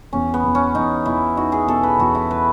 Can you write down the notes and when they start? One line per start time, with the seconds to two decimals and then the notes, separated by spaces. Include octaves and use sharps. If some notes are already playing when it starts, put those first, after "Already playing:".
0.13 E2 C#4
0.34 B3
0.44 E2
0.55 C#4
0.75 E2 D#4
1.06 E2 E4
1.37 D#4 F#4
1.52 G#4
1.68 B2 A4
1.83 B4
1.99 E2 F#4
2.15 E4
2.31 B4